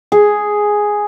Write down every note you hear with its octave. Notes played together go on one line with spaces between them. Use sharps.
G#4